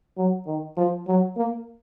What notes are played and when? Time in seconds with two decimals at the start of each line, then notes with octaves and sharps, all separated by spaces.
0.17 F#3
0.46 D#3
0.77 F3
1.07 F#3
1.36 A#3